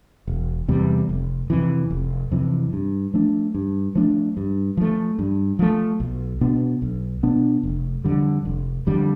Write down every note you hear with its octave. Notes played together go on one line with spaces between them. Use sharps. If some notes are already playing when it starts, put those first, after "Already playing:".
E1
E2 C3 G3
F1
F2 C3 E3
F1
F2 C3 E3
G2
F3 A3 D4
G2
F3 A3 D4
G2
F3 A3
G2
F3 A3
B1
B2 B3 D4
B1
B2 B3 D4
F1
F2 D3 G3
F1
F2 D3 G3